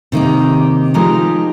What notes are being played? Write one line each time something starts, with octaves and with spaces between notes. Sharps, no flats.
C3 D#3 A#3 D#4 G4
F3 G#3 D#4 G4 A#4